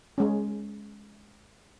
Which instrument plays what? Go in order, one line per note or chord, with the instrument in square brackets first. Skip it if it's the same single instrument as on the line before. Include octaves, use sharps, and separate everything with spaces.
[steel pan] G#3 C#4